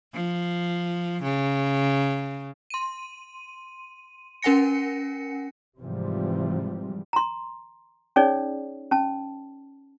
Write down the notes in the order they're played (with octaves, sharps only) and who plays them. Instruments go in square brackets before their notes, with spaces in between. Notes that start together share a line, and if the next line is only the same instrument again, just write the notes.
[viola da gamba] F3
C#3
[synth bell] C6 D#7
C#4 A#4 F#5 G#5 A#6 C#7
[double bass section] G#2 C3 E3 F3 G3
[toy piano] A#5 C6
C#4 D#4 G#4 C#5 D5
C#4 A5